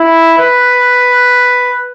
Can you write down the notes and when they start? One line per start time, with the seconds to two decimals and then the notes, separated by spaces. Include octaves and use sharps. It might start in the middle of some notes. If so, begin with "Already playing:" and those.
Already playing: E4
0.38 B4